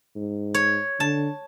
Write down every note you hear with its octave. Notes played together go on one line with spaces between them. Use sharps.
G#2
C#5
D3 A5